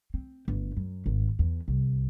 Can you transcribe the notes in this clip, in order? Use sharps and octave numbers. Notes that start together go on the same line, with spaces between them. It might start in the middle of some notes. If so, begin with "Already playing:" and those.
C4
G1
F#2
G#1
E2
C2